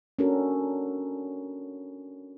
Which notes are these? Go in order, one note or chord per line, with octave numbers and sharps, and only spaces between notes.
C#4 D4 F#4 A4 A#4